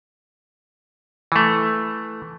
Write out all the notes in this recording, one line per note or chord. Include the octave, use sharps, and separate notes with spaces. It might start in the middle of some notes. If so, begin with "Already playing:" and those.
E3 A3